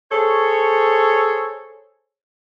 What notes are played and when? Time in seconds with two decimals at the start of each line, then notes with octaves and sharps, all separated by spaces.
0.11 G#4 A4 C5 C#5